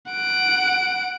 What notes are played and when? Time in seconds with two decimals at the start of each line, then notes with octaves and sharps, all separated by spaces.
0.12 F#5 D7